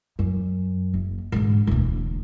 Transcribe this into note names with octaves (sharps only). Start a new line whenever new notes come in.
F#2
F#1
G#2 D3
E1 D2